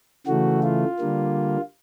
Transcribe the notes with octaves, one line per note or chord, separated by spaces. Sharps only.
C#3 E3 A3 F#4
F4
D3 G3 A#3